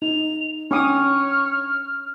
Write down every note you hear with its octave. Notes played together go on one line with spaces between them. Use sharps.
D#4 F7
C#4 D4 C#5 G5 D6 D#6 F6